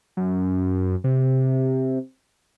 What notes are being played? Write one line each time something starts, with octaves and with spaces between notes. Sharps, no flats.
F#2
C3